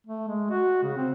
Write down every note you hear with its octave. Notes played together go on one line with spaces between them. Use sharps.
A3
G#3
F#4
C#3
C4